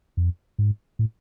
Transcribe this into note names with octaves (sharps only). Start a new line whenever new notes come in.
F2
G#2
A2